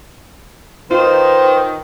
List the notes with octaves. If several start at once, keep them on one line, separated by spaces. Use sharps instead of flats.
D#3 F4 B4 C5